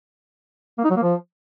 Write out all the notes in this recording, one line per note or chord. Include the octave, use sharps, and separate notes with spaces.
A#3
D#4
F#3
A#3
F3